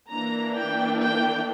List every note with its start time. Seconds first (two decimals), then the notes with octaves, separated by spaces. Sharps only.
0.10 E3 A#3 D4 A#5
0.56 G5
1.02 G5